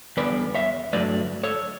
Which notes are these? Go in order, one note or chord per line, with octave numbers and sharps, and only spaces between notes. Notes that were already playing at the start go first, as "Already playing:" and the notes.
E2 D3 G3 B3 B4 D5
C#5 E5
G2 D3 F#3 A3 B4 D5
A4 C#5